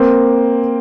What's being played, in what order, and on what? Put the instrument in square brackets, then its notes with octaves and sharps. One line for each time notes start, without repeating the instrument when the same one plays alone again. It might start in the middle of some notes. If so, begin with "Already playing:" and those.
Already playing: [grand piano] A#3 C4